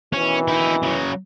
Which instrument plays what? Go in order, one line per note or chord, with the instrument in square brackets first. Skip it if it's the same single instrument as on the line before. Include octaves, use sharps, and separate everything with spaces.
[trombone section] B2 D#3 E3 [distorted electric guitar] C#4
[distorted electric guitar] D#4 E4
C#3 F#3